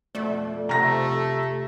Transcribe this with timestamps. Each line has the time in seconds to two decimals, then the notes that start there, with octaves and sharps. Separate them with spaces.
0.15 F2 B2 A3 D5
0.69 C3 A3 A#5 A#6